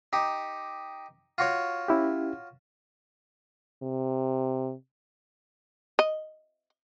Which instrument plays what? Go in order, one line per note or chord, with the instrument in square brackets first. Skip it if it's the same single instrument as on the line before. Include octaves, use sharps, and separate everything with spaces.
[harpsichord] D#4 G4
F4 F#4 C#5
[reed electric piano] C#4 E4 G4
[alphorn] C3
[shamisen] D#5